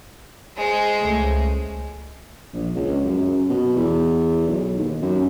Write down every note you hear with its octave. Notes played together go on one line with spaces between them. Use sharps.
G#3 C5
C#2 A3
A#1
C#2
F#2
F#2
B2
E2
B1
D#2
F#2